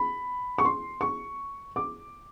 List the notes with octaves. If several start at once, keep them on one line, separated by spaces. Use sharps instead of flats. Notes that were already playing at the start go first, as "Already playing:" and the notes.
Already playing: B5
C#6
C6
C#6
D6